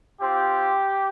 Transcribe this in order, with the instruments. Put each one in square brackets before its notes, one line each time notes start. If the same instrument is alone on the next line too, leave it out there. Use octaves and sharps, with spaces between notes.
[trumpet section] C4 F4 G4